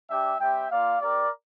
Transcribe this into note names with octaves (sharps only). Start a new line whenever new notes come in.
G3 D4 G4 E5 G5
G3 C4 G4 E5 G5
A#3 F4 D5 F5
C4 G4 A#4 D5